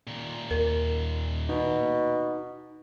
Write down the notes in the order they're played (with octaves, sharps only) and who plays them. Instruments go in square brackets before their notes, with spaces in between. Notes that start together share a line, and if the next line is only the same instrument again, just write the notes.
[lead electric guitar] A#2 D#3
[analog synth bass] D#2 [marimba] A#4
[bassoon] B2 [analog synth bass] D#4